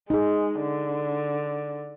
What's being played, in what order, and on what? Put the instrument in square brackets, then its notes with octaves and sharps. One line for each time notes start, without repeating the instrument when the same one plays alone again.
[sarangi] G#3 [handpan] D#4 G#4
[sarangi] D3